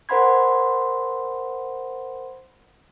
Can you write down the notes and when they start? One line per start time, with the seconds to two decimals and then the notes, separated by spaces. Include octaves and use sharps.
0.09 A#4 C5 F#5 B5 C6 G#6